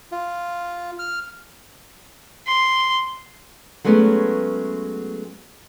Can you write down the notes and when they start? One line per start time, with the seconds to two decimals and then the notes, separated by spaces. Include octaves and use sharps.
0.12 F4
0.99 F6
2.47 C6
3.84 F#3 G#3 A3 B3 C#4